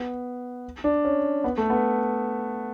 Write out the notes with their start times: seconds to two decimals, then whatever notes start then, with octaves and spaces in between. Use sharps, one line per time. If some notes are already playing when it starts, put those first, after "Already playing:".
Already playing: B3
0.84 D4
1.05 C#4
1.44 B3
1.58 A3
1.70 B3